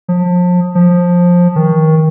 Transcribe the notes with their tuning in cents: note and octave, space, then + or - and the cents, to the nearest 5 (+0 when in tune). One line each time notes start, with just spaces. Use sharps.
F3 +35
F3 +15
D#3 +25